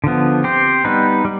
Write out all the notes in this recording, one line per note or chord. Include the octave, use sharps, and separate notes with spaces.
D3 F3 B3
C4 G4 C5
G3 B3 D#4 B4
G3